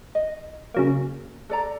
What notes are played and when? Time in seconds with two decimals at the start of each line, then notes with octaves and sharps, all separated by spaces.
0.15 D#5
0.74 C#3 F#3 A#3
1.50 A4 D5 A#5